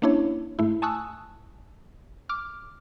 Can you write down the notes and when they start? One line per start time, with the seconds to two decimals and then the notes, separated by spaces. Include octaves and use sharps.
0.02 A#3 C#4 D4 E4 C#5
0.59 G#2 A3 E4
0.82 G#5 A5 C#6 D#6 E6 F#6
2.29 D6 F6